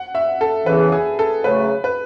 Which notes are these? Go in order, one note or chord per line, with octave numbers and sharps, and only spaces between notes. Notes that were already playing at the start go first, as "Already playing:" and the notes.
Already playing: F#5
E5
A4
E2 C#3 E3 B4
G#4
A4
C#3 F#3 A3 B4
B4